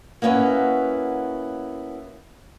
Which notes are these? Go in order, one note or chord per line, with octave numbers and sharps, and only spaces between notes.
A#3 B3 C#4 E4 F#4